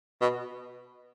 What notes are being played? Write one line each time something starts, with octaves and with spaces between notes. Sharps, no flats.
B2